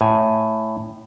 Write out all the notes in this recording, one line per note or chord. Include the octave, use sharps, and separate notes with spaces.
A2 G#5